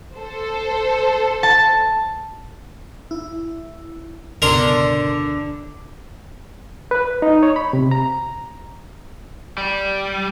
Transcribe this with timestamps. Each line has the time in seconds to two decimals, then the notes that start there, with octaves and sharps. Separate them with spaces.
0.16 A4 C5
1.43 A5
3.11 E4
4.42 C#2 G2 B2 D3 D4 A#4 A#5 C6
6.91 B4
7.22 D#4
7.43 C#5
7.56 B5
7.73 C3
7.91 A#5
9.58 G3